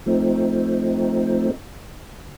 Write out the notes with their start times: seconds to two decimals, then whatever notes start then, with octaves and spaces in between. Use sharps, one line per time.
0.06 F3 A3 C4 D#4